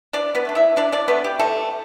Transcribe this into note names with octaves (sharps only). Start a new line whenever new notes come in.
E3 D4 D5
B3 B4
A3 D4
E4 E5
E3 D4 D5
D4 D5
A3 B3 D4 B4
G4
D3 A3 A4